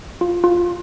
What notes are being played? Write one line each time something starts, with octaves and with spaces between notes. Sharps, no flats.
F4
F4